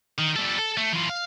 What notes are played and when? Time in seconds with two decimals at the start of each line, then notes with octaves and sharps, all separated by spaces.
0.18 D#3
0.36 G3 A4
0.58 A4
0.77 A3
0.93 E3 F4
1.09 F5